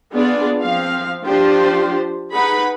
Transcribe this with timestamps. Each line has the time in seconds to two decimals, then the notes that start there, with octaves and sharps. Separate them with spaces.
0.12 B3 D4 F4 G#4 D5
0.61 F3 C4 F5
1.25 F3 D4 F4 G4 C5
2.33 D#4 G#4 B4 F#5 B5